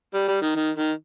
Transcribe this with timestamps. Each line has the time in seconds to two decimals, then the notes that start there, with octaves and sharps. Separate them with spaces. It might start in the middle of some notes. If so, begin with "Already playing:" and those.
0.15 G3
0.28 G3
0.42 D#3
0.56 D#3
0.77 D#3